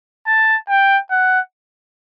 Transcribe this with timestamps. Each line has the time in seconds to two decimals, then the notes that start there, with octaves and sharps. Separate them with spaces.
0.27 A5
0.69 G5
1.11 F#5